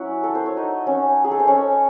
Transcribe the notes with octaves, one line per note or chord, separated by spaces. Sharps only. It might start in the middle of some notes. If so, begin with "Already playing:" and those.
Already playing: F#3 C#4 E4 F#4
A4
C5
C#5
D#4 D#5
C#4 C#5
G#4
A4
C5
C#4 C#5